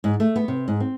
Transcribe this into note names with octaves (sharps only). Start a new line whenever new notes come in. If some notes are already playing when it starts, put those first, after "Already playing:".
G#2
A3
B3
C3
G#2
C4